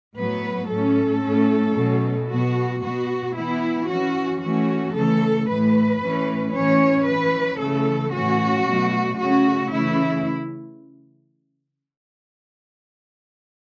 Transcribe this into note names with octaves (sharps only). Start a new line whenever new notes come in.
A2 F#3 B3 B4
A2 A3 C#4 A4
A2 A3 C#4
B2 F#3 A3 C#4
B2 B3 F#4
B2 B3 F#4
E3 B3 E4
E3 C#4 F#4
E3 A3 C#4 F#4
C#3 E3 A3 A4
A2 E3 A3 B4
A2 E3 A3 C#4
A2 E3 C#4 C#5
E3 C#4 B4
C#3 E3 A3 A4
A2 E3 C#4 F#4
B2 F#3 A3
C#3 A3 C#4 F#4
C#3 E3 A3 E4